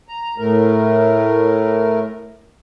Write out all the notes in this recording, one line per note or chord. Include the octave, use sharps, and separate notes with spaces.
A#5
A2 A3 A#4